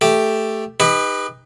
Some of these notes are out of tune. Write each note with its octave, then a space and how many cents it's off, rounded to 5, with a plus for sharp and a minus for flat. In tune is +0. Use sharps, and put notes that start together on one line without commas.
A3 +0 G4 +0
D#4 +0 G4 +35 B4 +0